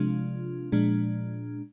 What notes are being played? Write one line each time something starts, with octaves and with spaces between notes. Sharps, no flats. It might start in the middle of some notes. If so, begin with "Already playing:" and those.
Already playing: C3 F3 G#3 D4 F4
A#2 F3 G#3 D4